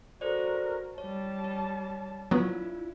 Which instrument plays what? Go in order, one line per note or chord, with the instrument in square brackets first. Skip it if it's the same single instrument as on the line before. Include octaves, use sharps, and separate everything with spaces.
[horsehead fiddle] F#4 A#4 [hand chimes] A4 C5 D5
[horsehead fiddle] G3 A5 [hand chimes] C#5
[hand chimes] C#5
[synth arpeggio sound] F#3 B3 [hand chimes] D4 F4 [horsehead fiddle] E4